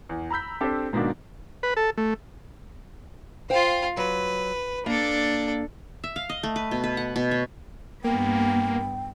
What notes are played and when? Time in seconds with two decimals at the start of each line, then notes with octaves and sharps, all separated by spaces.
0.09 E2
0.30 A#5 B5 E6 G6 B6
0.61 C4 D4 G4 A4 C5
0.93 G#2 B2 D#3 A#3 D4
1.63 B4
1.77 A4
1.98 A3
3.50 F4 C5 F5 G5
3.97 F#3 B4
4.86 A#3 D4 A4
6.04 E5
6.16 F5
6.29 D#5
6.43 A3
6.56 B4
6.71 B2
6.84 B4
6.97 F#5
7.16 B2
7.31 C#5
8.04 G2 A#3 B3 G5